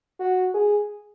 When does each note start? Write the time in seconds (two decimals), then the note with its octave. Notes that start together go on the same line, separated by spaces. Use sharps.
0.20 F#4
0.54 G#4